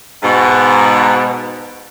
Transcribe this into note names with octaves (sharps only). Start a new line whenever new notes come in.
G#2 B2